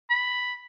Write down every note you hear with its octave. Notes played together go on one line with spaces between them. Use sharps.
B5